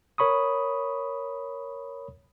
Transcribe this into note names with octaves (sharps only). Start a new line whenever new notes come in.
A#4 C#5 B5 C#6 D#6